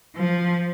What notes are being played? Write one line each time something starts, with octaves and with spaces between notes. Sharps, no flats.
F3